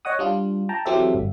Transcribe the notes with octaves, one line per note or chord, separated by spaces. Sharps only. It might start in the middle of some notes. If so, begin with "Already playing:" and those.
C#5 D#5 F#5 D#6
G3 D4 F4
G5 A5 A#5
E3 F#3 C4 G4 A4 E5
G1